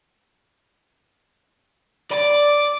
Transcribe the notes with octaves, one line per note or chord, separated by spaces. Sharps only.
D5 D6